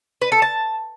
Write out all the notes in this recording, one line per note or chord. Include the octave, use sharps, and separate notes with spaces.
B4
A4
A5